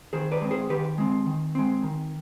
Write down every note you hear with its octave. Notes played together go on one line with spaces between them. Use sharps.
D#3 G#4 C5
B4 D5
G#3 C4
G#4 C5
D#3 G4 B4
G#3 C4
D#3
G#3 C4
D#3